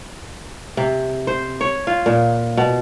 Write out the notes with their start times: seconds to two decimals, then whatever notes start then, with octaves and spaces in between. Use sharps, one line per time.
0.77 C3
1.27 C5
1.61 C#5
1.87 F4
2.06 A#2
2.57 B2